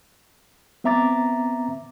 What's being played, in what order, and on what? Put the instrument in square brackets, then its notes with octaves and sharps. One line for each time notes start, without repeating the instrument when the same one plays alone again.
[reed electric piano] B3 C4 E5 A#5 D6 A6